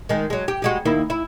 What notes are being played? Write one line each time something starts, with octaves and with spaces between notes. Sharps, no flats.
D#3 G#3
F#3 G#3
G4
G3 G#3 F#4
D#2 A#3 E4
E4